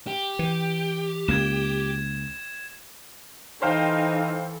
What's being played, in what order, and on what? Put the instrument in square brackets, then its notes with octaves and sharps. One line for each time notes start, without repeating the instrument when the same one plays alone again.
[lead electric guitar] G4
[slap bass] E3
[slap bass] C#2 A#3 [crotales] G#6 E7
[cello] E3 A4 [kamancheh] D#4 [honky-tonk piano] C5 F5 G5